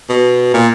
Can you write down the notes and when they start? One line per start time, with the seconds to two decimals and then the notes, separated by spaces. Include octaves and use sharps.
0.09 B2
0.54 A#2